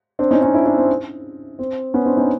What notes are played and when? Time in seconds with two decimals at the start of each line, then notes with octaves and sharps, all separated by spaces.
0.19 C4 D4
0.31 C#4 D#4
0.42 C#4 D#4
0.54 D4 E4
0.66 D4 E4
0.77 C4
1.59 C4
1.94 B3 C#4
2.06 C4 D4
2.17 C#4 D#4